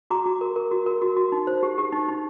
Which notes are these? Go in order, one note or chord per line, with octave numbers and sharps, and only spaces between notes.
F#4 A#5 D6
F#4
A#4
A#4
F#4
A#4
F#4
F#4
D#4
C5
G4
G4
D#4
D#4